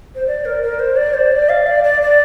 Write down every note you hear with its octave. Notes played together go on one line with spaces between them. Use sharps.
C5
D5
A#4
A#4
C5
D5
C5
D5
F5
D5
D5
D5